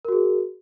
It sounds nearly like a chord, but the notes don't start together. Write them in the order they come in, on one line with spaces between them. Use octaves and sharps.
A#4 F#4 G#4